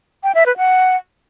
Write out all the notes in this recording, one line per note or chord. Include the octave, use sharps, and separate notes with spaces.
G5
E5
B4
F#5